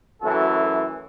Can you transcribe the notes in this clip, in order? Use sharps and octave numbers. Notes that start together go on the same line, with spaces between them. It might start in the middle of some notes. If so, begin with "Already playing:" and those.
F#2 E3 A3 F#4 A4